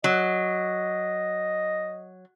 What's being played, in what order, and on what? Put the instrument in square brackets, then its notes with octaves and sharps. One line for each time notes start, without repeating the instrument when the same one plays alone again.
[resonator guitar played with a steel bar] F#3 [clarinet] D#5